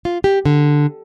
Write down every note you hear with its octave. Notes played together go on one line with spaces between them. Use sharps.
F4
G4
D3